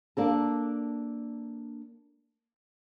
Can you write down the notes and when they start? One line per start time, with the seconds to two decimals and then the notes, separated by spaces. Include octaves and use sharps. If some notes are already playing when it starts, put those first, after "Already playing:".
0.17 A#3 D4 A4